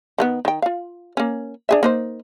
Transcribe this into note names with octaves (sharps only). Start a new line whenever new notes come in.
D#3 A#3 B3
D#3 G5
F4 F5
A#3 C#4
D4 G#4 E5
A#3 D#4 C5